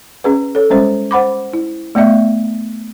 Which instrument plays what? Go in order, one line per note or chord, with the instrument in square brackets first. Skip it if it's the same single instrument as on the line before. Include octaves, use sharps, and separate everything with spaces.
[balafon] C#4 G#4 B4
A4 C#5
G3 G#3 C#4 C5
C5 F#5 B5 D6
E4
A3 B3 D5 E5